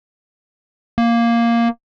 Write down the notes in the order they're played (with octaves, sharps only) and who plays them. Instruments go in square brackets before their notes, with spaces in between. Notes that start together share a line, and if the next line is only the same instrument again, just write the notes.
[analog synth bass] A#3